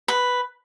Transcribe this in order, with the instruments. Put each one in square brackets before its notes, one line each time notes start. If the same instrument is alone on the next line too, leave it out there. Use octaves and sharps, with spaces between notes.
[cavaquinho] B4